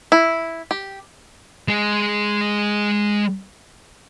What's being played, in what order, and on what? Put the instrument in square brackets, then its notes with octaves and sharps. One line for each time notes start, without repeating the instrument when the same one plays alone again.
[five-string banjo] E4
G4
[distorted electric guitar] G#3 G#4